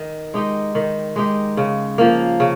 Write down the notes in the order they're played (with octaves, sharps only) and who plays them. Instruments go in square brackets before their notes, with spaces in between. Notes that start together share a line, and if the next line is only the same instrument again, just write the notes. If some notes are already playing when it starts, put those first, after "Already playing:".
Already playing: [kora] D#3
G#3 D#4 G4
D#3
G#3 D#4 G4
C#3
F3 A#3
C#3